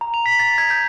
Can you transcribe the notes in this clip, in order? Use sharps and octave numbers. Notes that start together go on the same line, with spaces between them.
A#5
F7
B6
A6
G#6
G6